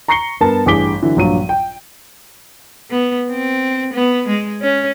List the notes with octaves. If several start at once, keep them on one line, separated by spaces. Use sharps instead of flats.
A#5 C#6 A#6 C7 C#7 G7
G2 B3 A#4 A5
A1 G2 G#4 D6 B6 G7
D3 E3 F#3
A#1 G2 F#3 F4 D#7
G5
B3
C4
B3
G#3
C#4